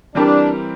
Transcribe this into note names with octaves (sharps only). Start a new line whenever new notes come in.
E3 G3 C4 D4 G4 A#4